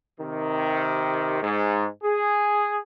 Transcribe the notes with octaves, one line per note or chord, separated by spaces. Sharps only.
C3 D#3
G#2
G#4